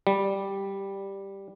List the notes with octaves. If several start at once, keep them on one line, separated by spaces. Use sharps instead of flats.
G3